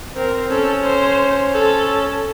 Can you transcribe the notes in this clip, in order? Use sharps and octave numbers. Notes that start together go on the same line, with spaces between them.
C4 A#4 C5
C#4 A4 C#5
C5
A4